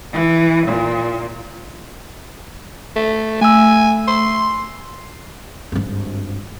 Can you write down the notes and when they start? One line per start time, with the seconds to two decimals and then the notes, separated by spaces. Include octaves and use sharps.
0.12 E3
0.66 A#2
2.96 A3
3.41 A3 G#5 E6
4.07 C6
5.72 G#1 G2